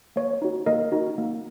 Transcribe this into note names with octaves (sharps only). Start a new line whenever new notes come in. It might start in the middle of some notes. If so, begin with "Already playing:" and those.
A#3 C#5
D#4 F#4
A#3 A#4 D#5
D#4 F#4
A#3